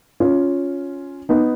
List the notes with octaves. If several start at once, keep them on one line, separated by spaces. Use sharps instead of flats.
C#4 F4
B3 D#4